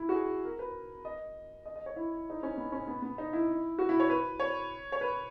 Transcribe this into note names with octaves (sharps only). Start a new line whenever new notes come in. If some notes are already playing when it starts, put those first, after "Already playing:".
Already playing: E4
F#4
G#4
A#4
B4
D#5
D#5
D#5
C#5
E4
D#4
C#4
B3
C#4
B3
B3
D#4
E4
F#4
E4
C#5
B4
C#5
C#5
B4